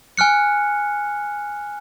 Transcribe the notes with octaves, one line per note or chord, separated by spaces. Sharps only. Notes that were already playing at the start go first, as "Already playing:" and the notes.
G#5 F6 F#6 C#7